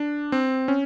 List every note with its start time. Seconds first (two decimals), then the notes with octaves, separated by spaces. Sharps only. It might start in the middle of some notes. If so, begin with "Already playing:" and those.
Already playing: D4
0.32 C4
0.68 C#4